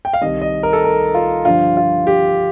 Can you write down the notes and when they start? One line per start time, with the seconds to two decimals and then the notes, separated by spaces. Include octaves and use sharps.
0.05 G5
0.13 F5
0.21 C2 C3 D#3 D#5
0.42 D#5
0.63 A#4
0.73 A4
0.84 A#4
1.15 F4
1.45 G2 D3 F3 F4
1.77 F4
2.07 G4